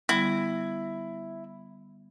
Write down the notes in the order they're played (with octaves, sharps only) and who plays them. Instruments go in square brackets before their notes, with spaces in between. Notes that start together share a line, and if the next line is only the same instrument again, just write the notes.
[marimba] D3 G3 B3 [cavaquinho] E4